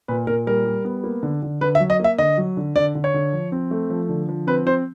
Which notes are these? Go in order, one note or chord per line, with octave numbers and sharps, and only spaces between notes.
A#2 B4
A#2 A#4
G3 A#4
G3
B3
A#3
D3
D3
D3 B4
E5
F#3
D#5
A#3 E5
D3 D#5
F#3
D3
D3 D5
D3
C#5
D3
F3
C4
A3
F3
D3
F3
C4 B4
C4 C5